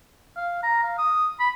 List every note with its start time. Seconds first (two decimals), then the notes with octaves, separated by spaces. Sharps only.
0.36 F5
0.63 A#5
0.83 F5
0.98 D#6
1.40 B5